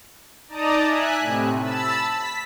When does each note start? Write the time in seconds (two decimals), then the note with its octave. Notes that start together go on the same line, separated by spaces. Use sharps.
0.48 D#4 D5 D#5 A5 A#5 D#6
0.84 E5 G#5 F#6
1.20 A2 C3
1.61 A5 B5 E6
2.10 B6